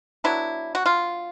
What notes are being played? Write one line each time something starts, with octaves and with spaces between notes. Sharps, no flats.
F#3 B3 D4 E4
F#4
F4